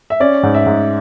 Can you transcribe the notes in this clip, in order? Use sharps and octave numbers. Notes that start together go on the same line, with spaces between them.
E5
C#4 D5
G#2
E5
G#2